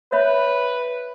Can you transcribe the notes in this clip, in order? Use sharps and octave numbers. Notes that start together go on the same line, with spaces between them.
B4 C#5 E5 B5